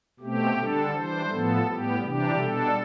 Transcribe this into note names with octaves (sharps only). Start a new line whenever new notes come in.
B2 A3 C4 G4
D3 G3 D4 A4
E3 G3 D4 C5
A2 F3 B3 A4
A2 G3 B3 G4
C3 E3 G3 D4 G4
B2 G3 D4 A4